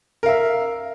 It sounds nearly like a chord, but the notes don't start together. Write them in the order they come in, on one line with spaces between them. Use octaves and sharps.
A#4 F5 E5